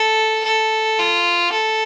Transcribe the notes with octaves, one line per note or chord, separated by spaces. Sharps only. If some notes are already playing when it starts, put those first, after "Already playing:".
Already playing: A4
A4
F4
A4